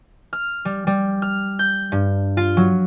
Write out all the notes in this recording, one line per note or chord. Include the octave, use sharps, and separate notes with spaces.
F6
G3
G3
F6
G6
G2
F4
F#3